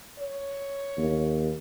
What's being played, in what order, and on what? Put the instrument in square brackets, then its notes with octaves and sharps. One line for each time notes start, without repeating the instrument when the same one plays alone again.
[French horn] C#5
[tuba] D#2